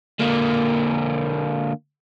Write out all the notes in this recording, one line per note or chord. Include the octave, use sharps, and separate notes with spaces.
D3 A#3